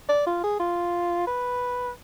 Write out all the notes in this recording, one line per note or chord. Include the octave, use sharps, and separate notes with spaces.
D5
F4
G#4
F4
B4